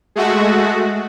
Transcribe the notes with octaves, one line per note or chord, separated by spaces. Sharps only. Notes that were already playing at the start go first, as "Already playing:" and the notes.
G#3 A3 F#4